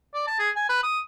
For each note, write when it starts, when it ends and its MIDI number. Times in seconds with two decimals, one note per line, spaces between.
0.14 0.26 74
0.27 0.39 81
0.39 0.50 68
0.56 0.68 80
0.69 0.81 71
0.83 1.00 87